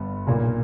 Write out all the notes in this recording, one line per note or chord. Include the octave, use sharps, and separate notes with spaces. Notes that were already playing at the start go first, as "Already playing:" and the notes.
Already playing: G1 G2 G3 B3
B1 A#2 A#3